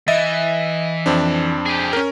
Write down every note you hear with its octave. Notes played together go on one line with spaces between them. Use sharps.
E3 D#5 E5 A6
F2 C4 D4
G4 G#4
C#4 A#4